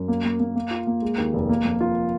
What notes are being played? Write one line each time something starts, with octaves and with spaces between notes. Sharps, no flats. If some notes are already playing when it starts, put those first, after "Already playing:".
Already playing: F#2
A#3
A#3
A#3
A#3
F4
A#3
G#3
D#2
F1
A#3
F2
F4